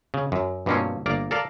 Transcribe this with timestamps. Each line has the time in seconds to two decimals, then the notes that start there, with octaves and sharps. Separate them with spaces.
0.14 C#3
0.32 F#2
0.66 G2 B2 F3 A#3 C4 C#4
1.06 G1 A#3 A#4 D5 A#5
1.31 A4 A#4 D5 F5